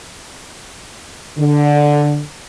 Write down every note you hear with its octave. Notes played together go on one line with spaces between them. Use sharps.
D3